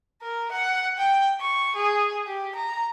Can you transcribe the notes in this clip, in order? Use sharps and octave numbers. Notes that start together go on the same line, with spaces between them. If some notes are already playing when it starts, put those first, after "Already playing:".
A#4
F#5
G5
C#6
G#4
G4
A#5